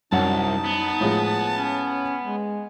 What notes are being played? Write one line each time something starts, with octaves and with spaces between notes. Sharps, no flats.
C2 F#2 D#4 F#5 A5
B3
A2 F3 G#3
C#4
G#3